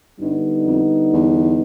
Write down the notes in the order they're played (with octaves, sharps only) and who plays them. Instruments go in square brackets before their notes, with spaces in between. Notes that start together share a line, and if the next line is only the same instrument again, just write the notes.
[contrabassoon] G2 [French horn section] D3 G3 B3 D#4
[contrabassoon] F2
E2